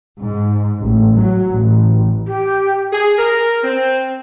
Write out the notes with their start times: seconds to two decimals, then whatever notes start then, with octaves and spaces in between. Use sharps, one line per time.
0.20 G#2
0.81 A1
1.16 F#3
1.52 A1
2.27 G4
2.92 G#4
3.19 A#4
3.63 C4